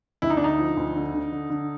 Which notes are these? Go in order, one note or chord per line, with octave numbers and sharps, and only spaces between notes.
D2 E4
D#4
D4
D3 D#4
F3
D2
D3
D3
D3
D3